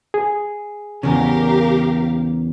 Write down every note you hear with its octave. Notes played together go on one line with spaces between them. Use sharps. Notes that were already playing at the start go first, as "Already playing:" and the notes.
G#4
E2 C#3 G4 A#4 F5